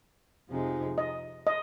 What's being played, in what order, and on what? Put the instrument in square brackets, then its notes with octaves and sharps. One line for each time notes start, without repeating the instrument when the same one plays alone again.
[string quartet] F2 C3 F3 G#3 D#4
[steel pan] D#5
D#5